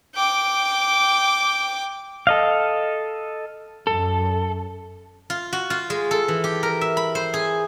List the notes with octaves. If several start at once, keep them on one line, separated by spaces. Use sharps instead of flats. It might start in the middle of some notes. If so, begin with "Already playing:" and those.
G5 D6
A4 D#5 F5
F#2 A4
F4
F#4
F4
G#3
A4
E3
G4
A#4
E5
B5
C5
G#4